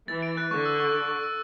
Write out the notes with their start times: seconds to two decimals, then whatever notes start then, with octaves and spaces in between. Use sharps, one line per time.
0.08 E3 A6
0.22 D7
0.37 F#6
0.51 D3 C#6
0.65 E6
0.80 C#6
0.94 C#6
1.08 C#6
1.23 E6